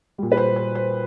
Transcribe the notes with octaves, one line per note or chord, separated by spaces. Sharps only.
A#2 G3
B4
C5
C5
C5